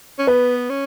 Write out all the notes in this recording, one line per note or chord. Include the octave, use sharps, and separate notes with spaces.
C#4
B3 B4
C#4